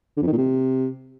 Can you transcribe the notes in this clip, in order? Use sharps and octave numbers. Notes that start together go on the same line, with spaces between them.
D3
F2
D#3
A#2
C3